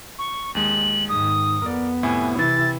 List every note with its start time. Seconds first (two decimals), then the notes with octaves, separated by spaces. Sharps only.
0.18 C#6
0.55 D#2 G#3 F#7
1.09 G#2 D#3 D#6
1.62 F2 B3 A#4 D5
2.03 A2 C3 E4 G#5
2.39 C3 E3 E4 A6